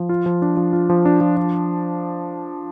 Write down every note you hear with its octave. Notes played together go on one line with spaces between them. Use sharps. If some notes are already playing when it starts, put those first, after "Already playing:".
Already playing: F3
F4
F3
D4
F3
F4
F3
D4
F3
D4